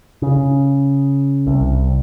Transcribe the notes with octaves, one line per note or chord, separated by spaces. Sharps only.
C#3
C2